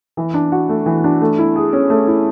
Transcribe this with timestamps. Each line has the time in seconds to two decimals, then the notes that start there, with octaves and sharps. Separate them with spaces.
0.17 E3
0.34 D4
0.52 F#4
0.69 A3
0.86 E3
1.04 D4
1.21 A3
1.38 E4
1.56 G#4
1.73 C#4
1.90 A3
2.07 E4